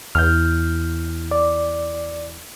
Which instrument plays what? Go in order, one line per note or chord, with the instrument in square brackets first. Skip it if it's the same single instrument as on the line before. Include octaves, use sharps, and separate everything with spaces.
[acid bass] E2 [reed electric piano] F6 G6
[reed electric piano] D5